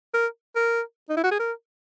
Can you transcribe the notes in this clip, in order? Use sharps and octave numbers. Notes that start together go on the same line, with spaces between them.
A#4
A#4
D#4
E4
F#4
G#4
A#4